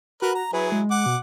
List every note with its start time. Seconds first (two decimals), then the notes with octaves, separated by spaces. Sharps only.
0.22 F#4 A#4 B4
0.35 A#5
0.53 F#3 E4 G#4 B4
0.72 G#3
0.91 F#5 D6
1.06 B2